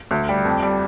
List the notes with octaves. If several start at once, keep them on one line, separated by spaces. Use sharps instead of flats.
D2
G3
F2
G3